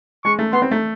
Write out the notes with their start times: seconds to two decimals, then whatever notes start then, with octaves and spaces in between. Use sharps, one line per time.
0.25 G#3 C#6
0.39 A3
0.53 B3 C6
0.62 C4
0.71 A3